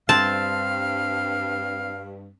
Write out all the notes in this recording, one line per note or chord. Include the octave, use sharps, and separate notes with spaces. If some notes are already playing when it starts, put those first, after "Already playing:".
G2 C4 F5 A5